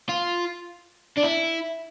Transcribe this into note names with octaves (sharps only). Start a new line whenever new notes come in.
F4
D4
E4